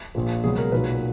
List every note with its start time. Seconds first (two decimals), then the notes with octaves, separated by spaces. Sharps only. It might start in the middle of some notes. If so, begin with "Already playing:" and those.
0.15 A#1 A#2 F3
0.44 C#2 B2 F#3 G#4
0.58 A#4
0.72 B1 A#2 F#3 B4